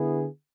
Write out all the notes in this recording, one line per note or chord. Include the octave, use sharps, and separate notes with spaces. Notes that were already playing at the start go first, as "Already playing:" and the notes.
Already playing: D3 B3 E4 G#4